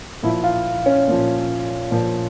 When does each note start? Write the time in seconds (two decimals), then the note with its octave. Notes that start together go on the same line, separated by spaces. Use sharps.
0.23 A#2 F3 E4
0.44 F4
0.86 C#4
1.08 A#2 F3
1.91 A#2 F3